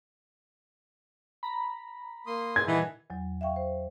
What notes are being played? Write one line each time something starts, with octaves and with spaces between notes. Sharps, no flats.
A#5 B5
A#3 C6 D#6
G#6
A#2 D#3 E3 G3 A4 D#5 F#5
E2 F#3
E5 F5 G5 C#6
C5